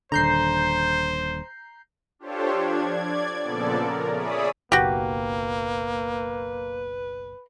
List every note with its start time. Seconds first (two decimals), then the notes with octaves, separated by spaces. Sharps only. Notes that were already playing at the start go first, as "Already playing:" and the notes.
0.12 D#1 D3 C5 A#5 G6 C7
2.19 D4 F4 G4 A4 C5 C#5
2.52 F3 D4 G#6
2.84 D5 G#6
3.43 A#2 C#3 F3 B3 A4 D5
3.76 A#4
4.11 G#4 C#5 D5 E5 B5 D#6
4.72 F#1 B1 A#3 F#4 G4 B4